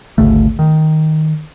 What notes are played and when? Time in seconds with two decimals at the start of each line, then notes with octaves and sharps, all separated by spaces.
0.18 G#1 D2 C#3 A3
0.59 D#3